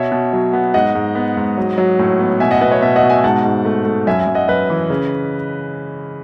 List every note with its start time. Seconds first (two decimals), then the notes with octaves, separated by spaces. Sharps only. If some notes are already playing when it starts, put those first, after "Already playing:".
Already playing: B2 C#5 E5
0.12 B2
0.33 F#3
0.53 B3
0.74 G#2 D#5 F#5
0.95 G#2
1.15 B3
1.37 G#2
1.58 F#3
1.78 F#3
1.99 A2
2.19 B3
2.40 B2 E5 G#5
2.51 D#5 F#5
2.61 B2 B4 D#5
2.72 C#5 E5
2.82 B2 C#5 E5
2.96 D#5 F#5
3.03 B2
3.10 E5 G#5
3.24 G#2 F#5 A5
3.45 G#2
3.65 A3
3.85 A3
4.07 F#2 E5 G#5
4.20 E5 G#5
4.27 F#2
4.35 D#5 F#5
4.48 F#2 B4 D#5
4.70 E3
4.90 C#3